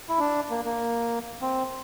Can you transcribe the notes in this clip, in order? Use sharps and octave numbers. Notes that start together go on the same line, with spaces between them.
E4
D4
A#3
A#3
C4